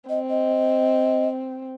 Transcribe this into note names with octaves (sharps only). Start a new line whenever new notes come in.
C4 D#5
D#5